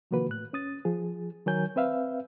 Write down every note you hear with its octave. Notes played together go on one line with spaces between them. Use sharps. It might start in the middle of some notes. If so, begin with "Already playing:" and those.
C3 D#3 F3 A#3 F#4 B4
A2 F#6
C#4 D#6 A6
F3 G#4
D#3 F#3 A#4 C#5 G#5 G6
C4 B4 E5 F5